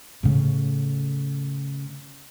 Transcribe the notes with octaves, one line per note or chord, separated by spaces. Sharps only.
A2 C#3